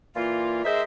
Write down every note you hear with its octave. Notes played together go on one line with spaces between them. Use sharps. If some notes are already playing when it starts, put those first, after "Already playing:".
A#2 E3 A#3 F4
G#3 D#4 G#4 A#4 C5 E5